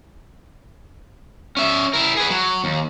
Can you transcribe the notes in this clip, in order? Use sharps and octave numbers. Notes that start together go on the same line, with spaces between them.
C#4 E5
E4 A#4
G#4 B4
F#3
D#2